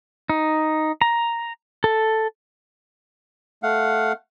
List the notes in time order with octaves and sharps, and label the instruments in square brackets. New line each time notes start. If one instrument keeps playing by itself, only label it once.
[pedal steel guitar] D#4
A#5
A4
[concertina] A3 F5 F#5